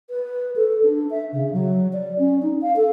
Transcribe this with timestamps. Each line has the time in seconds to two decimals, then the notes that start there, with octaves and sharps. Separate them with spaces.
0.10 B4
0.56 A4
0.83 D4
1.11 E5
1.33 C#3
1.53 F#3
1.93 D5
2.19 C#4
2.42 D#4
2.61 F5
2.76 A4